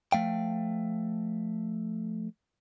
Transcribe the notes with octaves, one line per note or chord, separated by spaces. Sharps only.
F3 A3 F5 G5